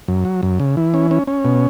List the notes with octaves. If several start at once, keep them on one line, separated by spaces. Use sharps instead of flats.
F#2
F#3
F#2
C#3
E3
C#4
C#4
C#4
B2